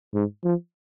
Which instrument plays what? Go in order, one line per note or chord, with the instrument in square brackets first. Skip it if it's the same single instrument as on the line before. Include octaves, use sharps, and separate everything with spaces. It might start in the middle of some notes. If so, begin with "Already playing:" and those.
[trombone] G#2
F3